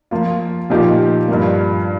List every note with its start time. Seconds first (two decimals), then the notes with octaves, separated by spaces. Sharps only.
0.11 F3 A#3 F4
0.70 A#2 F3 A#3 D#4 G4
1.28 G2 F3 A#3